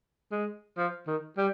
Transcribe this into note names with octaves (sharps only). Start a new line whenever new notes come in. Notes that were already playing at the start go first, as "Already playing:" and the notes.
G#3
F3
D#3
G3